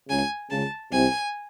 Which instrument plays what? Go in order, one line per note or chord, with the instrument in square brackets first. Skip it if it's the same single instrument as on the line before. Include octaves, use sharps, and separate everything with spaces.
[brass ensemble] C#2 C#3 [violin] G#5
[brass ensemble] C#2 C#3 [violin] A5
[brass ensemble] C2 C3 [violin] G#5